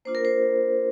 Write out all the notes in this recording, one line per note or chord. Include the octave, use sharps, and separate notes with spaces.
A#3 D4 F4 C5
A#4
C5